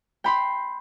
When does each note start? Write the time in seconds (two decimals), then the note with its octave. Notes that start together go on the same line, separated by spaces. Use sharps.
0.24 G5 B5 C6